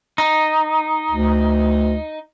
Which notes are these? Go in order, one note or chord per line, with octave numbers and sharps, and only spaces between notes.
D#4
D2